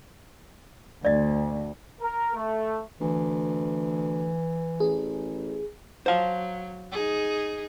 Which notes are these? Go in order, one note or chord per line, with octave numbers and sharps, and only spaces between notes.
D2 D5 D#5
A#4
A3
D2 E3
A1 G#4
F#3 C5 F5
D#4 G#4